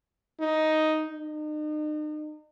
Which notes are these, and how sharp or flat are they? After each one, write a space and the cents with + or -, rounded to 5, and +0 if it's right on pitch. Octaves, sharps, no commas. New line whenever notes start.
D#4 +5
D#4 -40